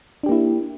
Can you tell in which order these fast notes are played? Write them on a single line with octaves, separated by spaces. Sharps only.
D4 G4 A#3 E4